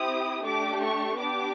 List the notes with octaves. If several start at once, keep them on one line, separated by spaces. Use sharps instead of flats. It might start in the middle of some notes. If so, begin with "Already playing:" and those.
Already playing: C4 E4 G4 D#6
A3 D4 G4 D6
C#6
B3 D4 G4 D6